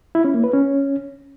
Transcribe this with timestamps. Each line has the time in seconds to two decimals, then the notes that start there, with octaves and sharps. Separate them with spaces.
0.15 E4
0.25 C#4
0.34 A#3
0.44 B4
0.53 C#4